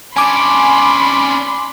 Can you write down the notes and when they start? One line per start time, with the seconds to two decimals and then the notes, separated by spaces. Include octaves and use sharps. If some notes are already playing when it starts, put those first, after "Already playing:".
0.16 C#4 D4 G#5 B5 C6 D6